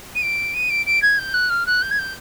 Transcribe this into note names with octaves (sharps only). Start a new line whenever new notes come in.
D#7
D7
D#7
D7
D7
G#6
G6
F#6
F6
F#6
G6
G#6
G6